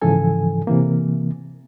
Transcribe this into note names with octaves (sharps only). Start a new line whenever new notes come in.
G#2 C#3 E3 F3 A4 G#5
C3 E3 A#3